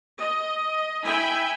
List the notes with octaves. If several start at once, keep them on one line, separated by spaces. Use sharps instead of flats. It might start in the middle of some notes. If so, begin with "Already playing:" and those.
D#5
E4 E5 G5 G#5 B5